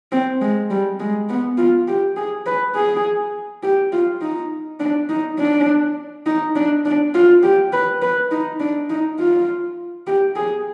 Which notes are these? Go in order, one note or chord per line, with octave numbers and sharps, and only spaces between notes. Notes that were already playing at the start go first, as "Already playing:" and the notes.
C4
G#3
G3
G#3
B3
F4
G4
G#4
B4
G#4
G4
F4
D#4
D4
D#4
D4
D#4
D4
D4
F4
G4
B4
B4
D#4
D4
D#4
F4
G4
G#4